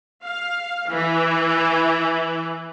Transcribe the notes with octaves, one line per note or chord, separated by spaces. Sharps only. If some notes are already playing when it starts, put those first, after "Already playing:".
F5
E3